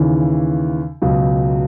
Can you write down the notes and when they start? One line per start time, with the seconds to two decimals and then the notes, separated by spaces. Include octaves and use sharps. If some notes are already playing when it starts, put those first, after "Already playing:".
Already playing: D#2 C#3 E3
1.02 C#2 B2 F#3